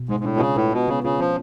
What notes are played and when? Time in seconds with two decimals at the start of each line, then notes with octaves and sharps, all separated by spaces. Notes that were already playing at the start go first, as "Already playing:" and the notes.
Already playing: B2
0.09 G#2 G#3
0.20 G#2
0.24 A2 D4
0.37 B2
0.40 C#3 F4
0.56 A2 B4
0.72 B2 F4
0.88 C#3 B3
1.04 C#3 F4
1.20 F3 C#4